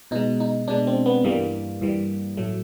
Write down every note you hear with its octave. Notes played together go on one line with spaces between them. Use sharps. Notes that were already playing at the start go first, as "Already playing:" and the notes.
B2 G#3 D#4
D#4
B2 G#3 D4
C4
B3
G2 E3 G3 A#3
G2 E3 G3
A2 F#3 A3